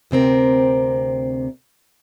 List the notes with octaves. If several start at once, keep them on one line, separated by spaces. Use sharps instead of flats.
D2 C3 C4 A#4